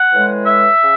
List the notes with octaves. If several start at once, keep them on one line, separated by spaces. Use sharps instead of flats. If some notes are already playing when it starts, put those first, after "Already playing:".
Already playing: F#5
A2 E3 G#3
E5
C#3